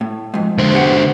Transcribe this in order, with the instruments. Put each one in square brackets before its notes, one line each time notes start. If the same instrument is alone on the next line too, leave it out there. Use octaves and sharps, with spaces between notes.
[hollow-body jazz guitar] A2
F2 G#2
[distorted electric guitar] D3 C5
[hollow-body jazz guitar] B3 G4 F#5